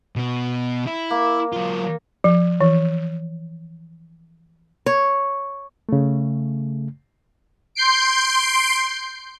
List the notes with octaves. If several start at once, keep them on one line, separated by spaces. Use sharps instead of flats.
B2 B3
E4
A#3
F#3 F4
F3
E3
C#5
C#3 A3
C6 G6 C7 D7